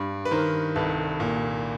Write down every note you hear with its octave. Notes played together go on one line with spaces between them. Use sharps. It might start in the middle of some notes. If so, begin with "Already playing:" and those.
Already playing: G2
B4
D#3 A#4 C5
C2 A4 B4
A#2